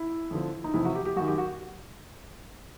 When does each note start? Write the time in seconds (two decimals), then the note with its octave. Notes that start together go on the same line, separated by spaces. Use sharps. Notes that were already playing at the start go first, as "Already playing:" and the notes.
Already playing: E4
0.31 F2 D3 F3
0.64 D#4
0.74 F2 C3 E3 E4
0.85 F#4
0.95 G4
1.05 G4
1.16 F#2 D#3 F#4
1.28 G4
1.38 F#4